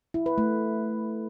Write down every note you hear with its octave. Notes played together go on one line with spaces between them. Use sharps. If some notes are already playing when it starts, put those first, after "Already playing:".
E4
B4
A3